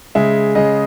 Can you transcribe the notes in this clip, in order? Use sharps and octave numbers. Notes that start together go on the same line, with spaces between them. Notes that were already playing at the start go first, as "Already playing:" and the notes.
C#3 G#3 E5
C#3 G#3 D#5